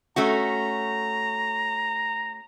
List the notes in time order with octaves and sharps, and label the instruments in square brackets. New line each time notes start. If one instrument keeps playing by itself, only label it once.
[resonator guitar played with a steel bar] A3 C#4 F#4 [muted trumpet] A#5